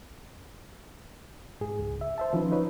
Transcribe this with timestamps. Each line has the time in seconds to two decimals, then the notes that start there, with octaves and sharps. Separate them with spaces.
1.61 G#2 G#4
1.79 C#2
2.01 E5
2.18 C5 E5 A5
2.33 D#3 F3 C#4 D#4 B4
2.51 D#4 F4 B4 C#5